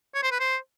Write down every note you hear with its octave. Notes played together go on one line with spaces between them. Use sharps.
C#5
C5
B4
C5